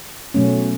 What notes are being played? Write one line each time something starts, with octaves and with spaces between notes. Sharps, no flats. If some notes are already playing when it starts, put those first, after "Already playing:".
B2 F#3 A3 C#4